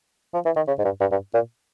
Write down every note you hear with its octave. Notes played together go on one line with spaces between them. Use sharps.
F3
E3
D#3
C#3
G#2
G2
G2
G2
A#2